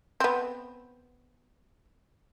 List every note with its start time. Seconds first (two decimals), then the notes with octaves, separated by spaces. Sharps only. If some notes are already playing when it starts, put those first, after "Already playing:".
0.20 B3 C4